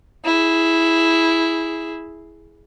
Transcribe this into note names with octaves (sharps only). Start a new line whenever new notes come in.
E4 G#4